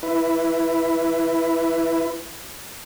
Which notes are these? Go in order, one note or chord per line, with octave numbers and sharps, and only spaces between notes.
E4 B4